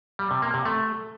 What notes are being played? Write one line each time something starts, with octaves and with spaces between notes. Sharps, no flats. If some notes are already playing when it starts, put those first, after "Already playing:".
G3
C3
A#3
C3
A3